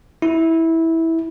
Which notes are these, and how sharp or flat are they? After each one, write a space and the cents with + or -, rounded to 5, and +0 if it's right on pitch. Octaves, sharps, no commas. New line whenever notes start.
E4 -15